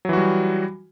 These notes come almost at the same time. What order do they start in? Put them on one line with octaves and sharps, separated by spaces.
F#3 E3 F#4 G3